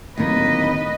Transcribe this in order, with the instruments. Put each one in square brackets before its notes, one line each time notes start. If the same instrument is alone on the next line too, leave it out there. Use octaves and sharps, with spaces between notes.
[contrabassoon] D1 [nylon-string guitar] D#2 D#3 [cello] B4 D#5